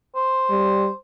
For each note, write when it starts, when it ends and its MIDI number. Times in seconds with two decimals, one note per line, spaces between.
0.15 0.97 72
0.50 0.89 55